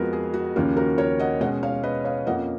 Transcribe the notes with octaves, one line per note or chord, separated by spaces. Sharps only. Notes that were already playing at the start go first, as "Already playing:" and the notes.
Already playing: F2 F3 G#3 B3 F#4 A#4
G#4
F#4
D#2 C#3 F3 A#3 C#4
F#4 A#4
A#4 C#5
D#5 F#5
B2 G#3 C#4 D#5 F#5
C#5 F5
B4 D#5
C#5 F5
F2 F3 A#3 C#4 D#5 F#5